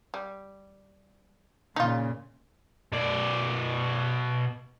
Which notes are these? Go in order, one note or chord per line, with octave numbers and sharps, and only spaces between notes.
G3
A#2 C#3 D#4 F4
B2 D5